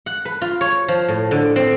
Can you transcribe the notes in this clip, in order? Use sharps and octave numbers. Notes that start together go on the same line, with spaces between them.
F#5
B4
F4
C#5
F3
A2
D3
C4